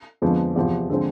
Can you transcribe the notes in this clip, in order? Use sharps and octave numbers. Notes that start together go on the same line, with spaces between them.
F2 D3 F3 G#3 B3
E2 C3 F3
D3 F3 G#3 C4